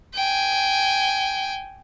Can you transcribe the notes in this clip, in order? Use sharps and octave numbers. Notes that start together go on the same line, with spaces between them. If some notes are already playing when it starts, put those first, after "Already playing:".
G5 G#5